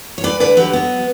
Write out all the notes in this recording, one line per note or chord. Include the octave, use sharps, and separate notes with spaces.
C#5
D2 B4 D5
D3 B4 D5
F#3 G4 B4
B3